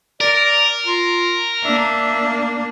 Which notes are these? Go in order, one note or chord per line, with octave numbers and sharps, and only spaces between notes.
A#4 D5
F4
A#3 D4 E5